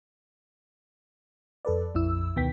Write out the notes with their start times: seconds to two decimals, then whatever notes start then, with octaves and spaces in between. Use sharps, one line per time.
1.65 F2 A4 B4 D5
1.95 A#1 F2 E4 E6
2.36 D2 B2 D#3 B3 G5 B6